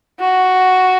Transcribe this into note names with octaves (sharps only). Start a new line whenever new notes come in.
F#4